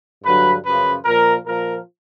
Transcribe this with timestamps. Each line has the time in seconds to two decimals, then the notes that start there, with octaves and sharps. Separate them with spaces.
0.24 G2 D3 F#3 B4
0.64 F#2 C#3 F3 B4
1.05 A#2 F3 A#4
1.46 A#2 F3 A#4